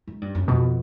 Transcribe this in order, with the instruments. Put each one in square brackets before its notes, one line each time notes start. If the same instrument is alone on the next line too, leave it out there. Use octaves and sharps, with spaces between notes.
[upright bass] G#2
G2
F#2
[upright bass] F2 [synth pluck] B2